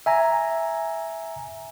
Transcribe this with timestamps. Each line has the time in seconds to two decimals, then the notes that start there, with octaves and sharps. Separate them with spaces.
0.06 E5 G#5 A#5